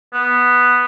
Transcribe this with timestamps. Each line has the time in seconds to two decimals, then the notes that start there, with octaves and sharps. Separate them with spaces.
0.13 B3